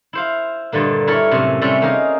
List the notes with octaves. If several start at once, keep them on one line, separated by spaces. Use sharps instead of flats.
E4 C5 F5
G2 A#2 D3 A#3
E4 A4 A#4 C#5
F#2 A2 C3
C3 G3 A3 C#4 A4
A#3 D#4 G#4 A#4